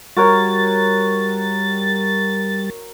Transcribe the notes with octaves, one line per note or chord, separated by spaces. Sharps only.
G3 F#4 A#4 C#5 A6